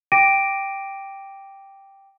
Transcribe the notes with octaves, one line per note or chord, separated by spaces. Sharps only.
G5 D6 A#6 D7 D#7